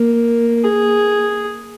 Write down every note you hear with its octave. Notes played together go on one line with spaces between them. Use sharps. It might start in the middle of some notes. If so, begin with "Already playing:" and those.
Already playing: A#3
G#4